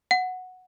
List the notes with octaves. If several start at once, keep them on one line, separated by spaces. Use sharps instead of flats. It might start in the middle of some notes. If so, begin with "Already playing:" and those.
F#5